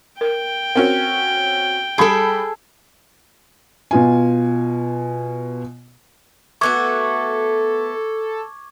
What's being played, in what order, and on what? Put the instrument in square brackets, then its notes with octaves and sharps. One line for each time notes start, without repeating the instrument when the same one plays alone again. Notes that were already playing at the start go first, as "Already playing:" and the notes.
[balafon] A#4 [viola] G5
[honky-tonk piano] C4 C#4 F#4 [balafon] A#4
[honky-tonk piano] G3 B5 D7 [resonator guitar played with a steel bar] G#4 A4
[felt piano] B2 F4 G#5
[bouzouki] A3 B3 F#4 [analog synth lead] A4 [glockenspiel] C#6 D6 G#6